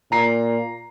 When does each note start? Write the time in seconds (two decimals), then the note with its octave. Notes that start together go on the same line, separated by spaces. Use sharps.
0.12 A#2 A#5 C7